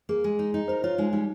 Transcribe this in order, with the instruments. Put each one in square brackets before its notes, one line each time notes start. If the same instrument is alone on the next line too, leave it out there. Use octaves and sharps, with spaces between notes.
[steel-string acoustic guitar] A#3 [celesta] G#4
[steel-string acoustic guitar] G#3
D#4
D#4
[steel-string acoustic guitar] A#4 [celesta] C5
[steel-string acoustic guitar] F4 [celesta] C#5
[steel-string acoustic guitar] G#3 [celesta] D#4
[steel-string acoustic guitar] G3 [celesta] D#4